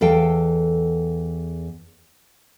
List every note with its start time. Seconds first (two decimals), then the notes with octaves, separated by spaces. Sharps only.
0.01 E2 A4 F5 G5